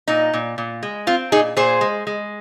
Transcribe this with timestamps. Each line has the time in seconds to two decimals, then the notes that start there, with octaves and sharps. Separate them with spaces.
0.08 A#2 D#4
0.33 A#2
0.58 A#2
0.83 G#3
1.07 C4 F4
1.32 A#2 D#4 G#4
1.57 A#2 G#4 C5
1.81 G#3
2.07 G#3